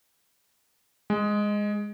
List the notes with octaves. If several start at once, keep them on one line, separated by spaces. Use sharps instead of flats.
G#3